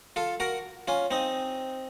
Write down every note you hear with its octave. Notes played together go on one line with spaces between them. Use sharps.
F4 A4
F#4 A#4
C#4 F4
C4 D#4